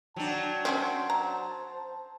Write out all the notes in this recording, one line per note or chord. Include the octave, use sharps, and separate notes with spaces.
F#3 D4 G5 A5
C4 C#4 F#4 C5
A#5